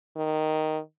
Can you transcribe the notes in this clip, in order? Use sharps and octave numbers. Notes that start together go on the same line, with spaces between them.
D#3